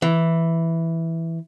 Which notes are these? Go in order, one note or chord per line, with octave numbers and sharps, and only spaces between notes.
E3